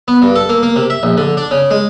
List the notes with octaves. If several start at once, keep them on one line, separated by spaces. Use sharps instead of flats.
B3
G2
A4
A#3
A#3
C3
E5
A#1
D3
D4
C#3
G#3